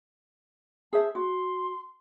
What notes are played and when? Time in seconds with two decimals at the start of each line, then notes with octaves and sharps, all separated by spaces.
0.93 G#4 C5 E5 A5
1.15 F#4 C6